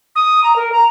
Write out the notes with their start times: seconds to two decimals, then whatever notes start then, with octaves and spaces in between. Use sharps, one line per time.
0.16 D#6
0.44 A#5
0.56 A#4
0.72 A#5